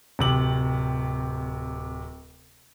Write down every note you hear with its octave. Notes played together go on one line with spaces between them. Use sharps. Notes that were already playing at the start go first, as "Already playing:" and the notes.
D1 C3 F#7